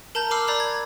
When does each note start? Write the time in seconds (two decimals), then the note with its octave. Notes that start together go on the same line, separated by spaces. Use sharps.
0.15 A#4 A5 A#5 G6
0.31 B5 D6 E6 F6 C7
0.48 D5 A#5 B5 F#6 G6
0.60 G#6